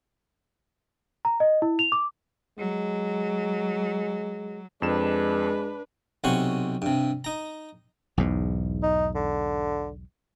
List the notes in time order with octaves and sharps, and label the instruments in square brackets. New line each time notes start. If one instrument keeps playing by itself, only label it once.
[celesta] A#5
D#5
E4
F7
D6
[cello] F#3 [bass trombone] G#3
[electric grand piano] F2 E7 [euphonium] G#3 [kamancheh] D4 B4
[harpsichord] B1 C3 C#4 C5 F#5 C#6
G2 C3
D#4 A#5
[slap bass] B1 E2 G#2
[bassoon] D#4
D3